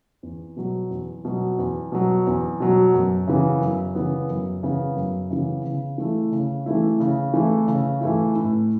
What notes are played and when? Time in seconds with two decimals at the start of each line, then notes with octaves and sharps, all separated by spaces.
0.23 E2
0.57 B2 F#3
0.90 E2
1.25 B2 F#3
1.59 E2
1.92 B2 F#3
2.27 E2
2.60 B2 F#3
2.94 F#2
3.27 C#3 E3 B3
3.61 F#2
3.95 C#3 E3 B3
4.30 F#2
4.63 C#3 E3 B3
4.96 F#2
5.30 C#3 E3 B3
5.65 C#3
5.98 E3 A3 E4
6.32 C#3
6.66 E3 A3 E4
7.00 C#3
7.34 E3 A3 E4
7.68 C#3
8.01 E3 A3 E4
8.36 A2